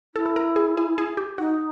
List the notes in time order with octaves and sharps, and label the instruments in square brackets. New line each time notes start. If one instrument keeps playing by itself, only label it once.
[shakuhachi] E4 [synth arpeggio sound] A4
[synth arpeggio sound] A4
A#4
G#4
G#4
G#4
G4
[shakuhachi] D#4 [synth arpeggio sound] F#4